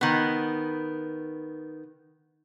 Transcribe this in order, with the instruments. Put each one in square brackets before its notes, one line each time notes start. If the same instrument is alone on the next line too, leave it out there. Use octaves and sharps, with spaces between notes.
[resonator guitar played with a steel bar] D#3 B3